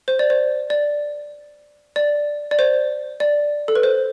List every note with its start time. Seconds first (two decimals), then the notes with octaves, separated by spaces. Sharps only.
0.08 C5
0.19 D5
0.30 C5
0.70 D5
1.96 D5
2.51 D5
2.59 C5
3.20 D5
3.68 A4
3.75 B4
3.83 C5